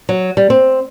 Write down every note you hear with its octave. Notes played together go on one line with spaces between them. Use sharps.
F#3
G3
C4